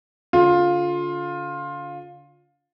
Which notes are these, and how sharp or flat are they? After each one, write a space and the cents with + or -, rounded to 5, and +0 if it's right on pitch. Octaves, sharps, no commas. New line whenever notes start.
D3 -35 F4 +15